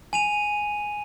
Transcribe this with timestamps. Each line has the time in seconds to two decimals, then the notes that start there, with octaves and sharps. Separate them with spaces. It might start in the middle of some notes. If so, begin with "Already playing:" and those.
0.13 G#5 D#7 F7